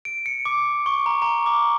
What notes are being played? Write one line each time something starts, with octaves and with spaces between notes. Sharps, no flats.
D7
C#7
D6
C#6
A#5
A#5
C#6
D6